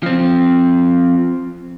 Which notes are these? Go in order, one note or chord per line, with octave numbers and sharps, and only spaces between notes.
F3 C4